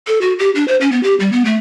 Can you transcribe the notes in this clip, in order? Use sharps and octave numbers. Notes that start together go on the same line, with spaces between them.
A4
F#4
G4
D4
C5
C#4
B3
G4
G3
B3
A3